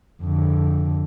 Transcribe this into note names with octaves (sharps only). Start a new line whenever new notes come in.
F2 D3